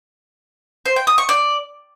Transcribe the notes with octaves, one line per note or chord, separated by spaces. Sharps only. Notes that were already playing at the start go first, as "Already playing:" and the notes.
C5
G5
D#6
C#6
D5